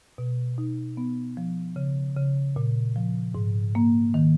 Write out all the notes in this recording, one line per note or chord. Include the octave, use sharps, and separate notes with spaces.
B2
D#4
B3
F3
C#3
C#3
A#2
F3
G#2
A#3
D#3